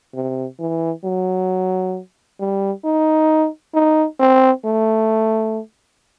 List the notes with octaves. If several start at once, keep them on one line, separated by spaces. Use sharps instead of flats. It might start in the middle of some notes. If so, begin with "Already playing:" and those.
C3
E3
F#3
G3
D#4
D#4
C4
A3